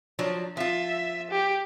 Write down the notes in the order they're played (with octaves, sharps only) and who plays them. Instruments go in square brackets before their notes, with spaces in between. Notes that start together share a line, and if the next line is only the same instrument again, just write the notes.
[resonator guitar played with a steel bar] F3 F#3 D4
[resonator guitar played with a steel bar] F3 F4 [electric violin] E5
[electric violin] G4